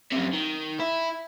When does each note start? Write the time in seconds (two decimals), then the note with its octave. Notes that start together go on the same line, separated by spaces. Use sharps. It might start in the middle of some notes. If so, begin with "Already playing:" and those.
0.12 F#2 C3
0.33 D#3
0.80 E4